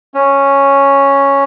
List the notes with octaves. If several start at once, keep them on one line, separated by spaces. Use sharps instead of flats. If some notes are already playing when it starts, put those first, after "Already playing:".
C#4